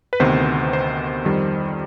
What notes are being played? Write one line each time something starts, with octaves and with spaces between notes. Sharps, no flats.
B4
D2 C3 D#3 B3 C5
C5
F2 D#3 G3